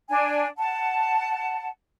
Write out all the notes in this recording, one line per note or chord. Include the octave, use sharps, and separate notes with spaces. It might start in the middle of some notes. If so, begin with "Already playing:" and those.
D4 G#5
F#5 A5